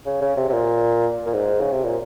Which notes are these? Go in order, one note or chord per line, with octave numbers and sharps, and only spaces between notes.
C#3
C#3
C3
C3
A#2
A#2
G#2
C#3
C3
A#2